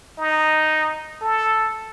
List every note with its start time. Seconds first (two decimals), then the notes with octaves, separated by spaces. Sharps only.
0.18 D#4
1.22 A4